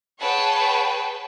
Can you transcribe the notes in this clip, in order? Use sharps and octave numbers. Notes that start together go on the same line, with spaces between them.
G#4 B4 C#5 F#5 G5 A5